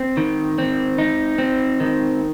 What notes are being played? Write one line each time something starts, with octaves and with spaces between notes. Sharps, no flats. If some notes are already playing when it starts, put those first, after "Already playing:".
Already playing: C4
D#3
C4
D#4
C4
D#3